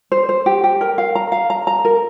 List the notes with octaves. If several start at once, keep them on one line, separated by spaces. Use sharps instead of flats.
C5
C5
G4
G4
A#4
F5
A#5
F5
A#5
A#5
A#4